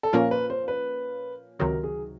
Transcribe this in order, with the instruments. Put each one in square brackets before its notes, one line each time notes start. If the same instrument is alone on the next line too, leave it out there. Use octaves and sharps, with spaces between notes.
[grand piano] A4
[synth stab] A#2 F3 A#3 C#4 F4 [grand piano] A#4
[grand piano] B4
C5
B4
[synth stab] C#2 C3 D#3 F#3 [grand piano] A#4
[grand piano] G#4